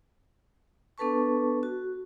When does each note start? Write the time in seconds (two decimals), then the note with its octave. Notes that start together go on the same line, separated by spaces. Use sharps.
0.98 B3 D4 A4 B4 A5 C#6
1.63 F#4